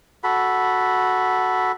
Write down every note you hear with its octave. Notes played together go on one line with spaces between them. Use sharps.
F#4 A4 B5